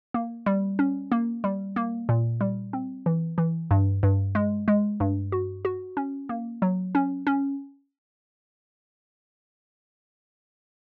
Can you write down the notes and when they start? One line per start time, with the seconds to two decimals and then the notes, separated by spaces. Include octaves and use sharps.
0.14 A#3
0.46 G3
0.79 C#4
1.12 A#3
1.44 G3
1.76 A#3
2.09 A#2
2.41 G3
2.73 C4
3.06 E3
3.38 E3
3.71 G2
4.03 G2
4.35 G#3
4.68 G#3
5.00 G2
5.32 F#4
5.65 F#4
5.97 C#4
6.29 A#3
6.62 F#3
6.95 C#4
7.27 C#4